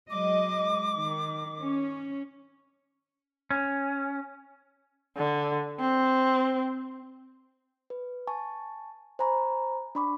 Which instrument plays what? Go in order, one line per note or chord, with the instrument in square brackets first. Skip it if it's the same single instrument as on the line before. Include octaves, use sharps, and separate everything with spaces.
[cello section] F#3 G#3 D#5 [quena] D6
[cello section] D#3
C#4
[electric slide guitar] C#4
[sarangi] D3
C4
[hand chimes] B4
G#5 A5 C#6
C5 G#5 A#5 B5 C#6
D4 D5 B5 C#6 D6